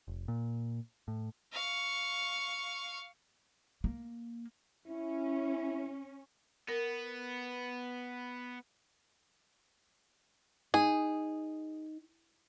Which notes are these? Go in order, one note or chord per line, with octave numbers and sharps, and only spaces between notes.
F1
A#2
A2
F5 C#6
A#3
C#4 E4
B3 A#4
D#4 G#4